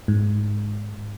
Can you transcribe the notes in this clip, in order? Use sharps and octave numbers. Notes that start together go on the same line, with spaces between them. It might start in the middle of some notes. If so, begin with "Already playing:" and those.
G#2